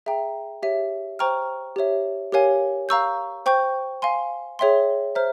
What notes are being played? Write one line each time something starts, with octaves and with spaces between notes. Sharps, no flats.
G#4 E5 G5 A#5
G4 C#5 E5
C5 G5 A#5 C#6 F6
G4 C#5 E5
G4 A#4 C#5 F5 G#5
F5 A#5 C#6 E6 G6
C5 G5 C#6 G6
F5 G#5 C6
G#4 C#5 E5 G5 C6
C5 E5 A#5 F6